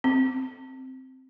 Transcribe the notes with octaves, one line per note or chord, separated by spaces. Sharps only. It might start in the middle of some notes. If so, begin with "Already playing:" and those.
C4